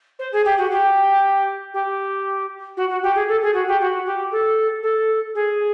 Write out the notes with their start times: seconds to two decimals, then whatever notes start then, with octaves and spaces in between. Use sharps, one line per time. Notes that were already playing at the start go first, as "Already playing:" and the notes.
0.19 C5
0.32 G#4
0.45 G4
0.57 F#4
0.71 G4
1.74 G4
2.77 F#4
2.89 F#4
3.02 G4
3.15 G#4
3.28 A4
3.42 G#4
3.54 F#4
3.67 G4
3.80 F#4
4.06 G4
4.31 A4
4.83 A4
5.35 G#4